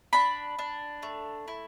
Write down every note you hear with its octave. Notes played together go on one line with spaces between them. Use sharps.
D4 B5
D4
A3
E4